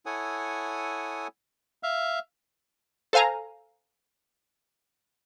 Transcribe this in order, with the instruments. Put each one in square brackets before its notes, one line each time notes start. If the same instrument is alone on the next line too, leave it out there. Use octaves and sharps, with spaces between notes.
[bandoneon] E4 A4 C#5 F#5 G#5 D#6
[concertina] E5 F5
[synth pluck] A4 C5 F5 G#5 A#5